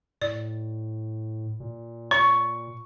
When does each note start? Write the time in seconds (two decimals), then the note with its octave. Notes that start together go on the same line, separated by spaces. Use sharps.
0.22 A2 D5
1.60 A#2
2.11 C#5 C#6